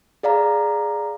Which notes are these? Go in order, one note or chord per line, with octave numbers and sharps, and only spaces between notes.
G#4 D5 F5 A#5